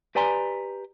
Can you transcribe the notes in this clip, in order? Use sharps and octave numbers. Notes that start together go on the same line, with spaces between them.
G4 B4 D5 G#5 A#5 C6